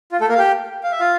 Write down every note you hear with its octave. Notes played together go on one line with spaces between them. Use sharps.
F4
A3 A4
A#3 A#4
F5
G4 G5
F5
E5
F4 F5